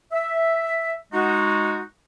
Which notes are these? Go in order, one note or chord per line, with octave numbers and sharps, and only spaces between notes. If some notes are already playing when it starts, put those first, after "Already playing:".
E5
G#3 D#4 F#4